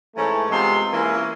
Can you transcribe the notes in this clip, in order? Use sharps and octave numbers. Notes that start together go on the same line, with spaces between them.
G#2 E3 A3 C#4 A5
C3 G#3 B3 F4 C5 C6
E3 A#3 C#4